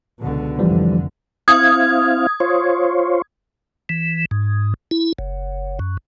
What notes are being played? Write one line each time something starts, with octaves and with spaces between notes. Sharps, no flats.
C#2 B2 D3
F1 D3 E3 F3 G3
C4 E4 F5 D#6 G#6
F4 C5 C#5
E3
G#2
E4
F#1
F#2